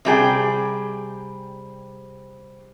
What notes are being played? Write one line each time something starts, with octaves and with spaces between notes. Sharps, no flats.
C3 G3 G#4 G5